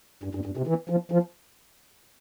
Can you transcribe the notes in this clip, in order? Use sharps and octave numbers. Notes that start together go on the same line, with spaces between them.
G2
G2
G2
C3
E3
F3
F3